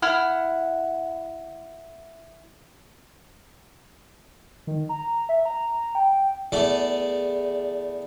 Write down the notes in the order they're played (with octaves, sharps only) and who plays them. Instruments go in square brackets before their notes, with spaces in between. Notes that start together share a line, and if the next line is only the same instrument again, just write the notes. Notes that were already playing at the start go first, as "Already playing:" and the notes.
[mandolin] E4 F#5 F6
[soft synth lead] D#3
A#5
E5
A#5
G5
[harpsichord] E2 A3 D5 A5